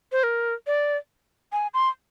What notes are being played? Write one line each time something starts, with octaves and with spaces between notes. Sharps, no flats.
C5
A#4
D5
G#5
C6